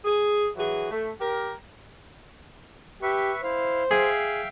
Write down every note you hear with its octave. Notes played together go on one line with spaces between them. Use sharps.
G#4
E3 F#3 F#4 G#4
A3
G4 A#4
G4 B4 E5 C#6
E4 C5 F5
G#4 E5 F5 G5